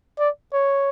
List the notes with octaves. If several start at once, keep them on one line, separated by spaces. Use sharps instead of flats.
D5
C#5